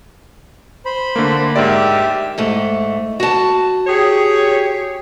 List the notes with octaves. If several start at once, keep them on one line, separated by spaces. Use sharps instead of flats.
C5 B5
D3 A3 A#3
G#2 G4 A#4 D5 E5
G#2 A3
F#4 A5
G4 G#4 C#5